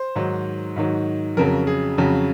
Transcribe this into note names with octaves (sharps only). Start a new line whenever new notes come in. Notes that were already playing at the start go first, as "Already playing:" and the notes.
Already playing: C5
G#2 D#3 F#3
G#2 D#3 F#3
F2 C#3 F#3 A#4
G#4
F2 C#3 F#3